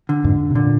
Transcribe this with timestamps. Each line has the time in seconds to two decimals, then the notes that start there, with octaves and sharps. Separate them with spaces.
0.09 D3
0.24 F2 G#2
0.50 C3
0.55 A#2 D3